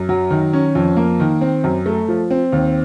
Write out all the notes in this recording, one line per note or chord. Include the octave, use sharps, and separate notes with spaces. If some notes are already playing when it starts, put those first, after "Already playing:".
Already playing: F#2
F#3
D#3
C#4
F2
A#3
D#3
C4
F#2
A3
F3
C4
D#2